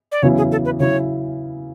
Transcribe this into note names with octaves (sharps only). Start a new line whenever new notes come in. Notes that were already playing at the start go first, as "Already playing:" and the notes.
D5
E2 C#3 F#3 C#4 E4 C#5
G#4
A4
B4
C#3 F#3 C#4 E4 C#5